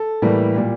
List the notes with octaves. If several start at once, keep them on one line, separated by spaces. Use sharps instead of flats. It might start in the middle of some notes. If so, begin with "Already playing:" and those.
Already playing: A4
A2 E3 G3 A#3
A#2 G3